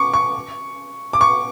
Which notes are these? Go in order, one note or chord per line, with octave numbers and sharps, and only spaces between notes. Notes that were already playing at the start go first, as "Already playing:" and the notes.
Already playing: C#6 D6
C#6
D6
C#6